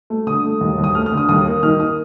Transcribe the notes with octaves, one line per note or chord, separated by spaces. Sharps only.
A3
D3 D#6
A3
D#2
D#2
D#6
A3 F6
F6
D3
D#6
D#2 D#6
A#3
D#3 F6
A#3 D#6